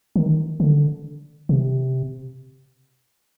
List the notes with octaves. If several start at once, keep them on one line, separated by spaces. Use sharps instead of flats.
D#3
D3
C3